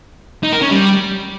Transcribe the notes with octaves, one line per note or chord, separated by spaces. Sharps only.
D#4
A#4
C#4
G3